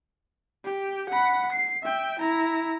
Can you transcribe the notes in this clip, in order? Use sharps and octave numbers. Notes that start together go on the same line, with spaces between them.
G4
F#5 B5
C7
E5 G5
E4 A#5